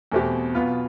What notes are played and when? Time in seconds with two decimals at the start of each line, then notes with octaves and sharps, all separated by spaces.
0.12 E2 B2 A3 C4 G4
0.54 B1 B2 B3 F4 B4